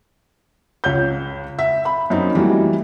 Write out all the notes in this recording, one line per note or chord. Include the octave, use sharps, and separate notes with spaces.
C#2 C#5 G6
E5
B5
F#2 A#3 C4 D#4
E3 G3 A3 A#3 F#4